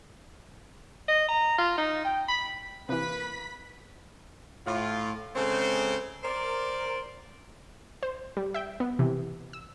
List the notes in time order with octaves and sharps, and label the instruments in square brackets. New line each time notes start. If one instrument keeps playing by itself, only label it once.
[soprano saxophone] D#5
A#5
F4
D#4
G5
B5
[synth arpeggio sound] C3 E3 [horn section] A#3 B4 [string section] B5 B6
[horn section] A2 F4
C#3 G#3 C4 A4 C5
A#4 C5 D5
[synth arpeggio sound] C5
G3
E5 G5
B3
C3 E3
E6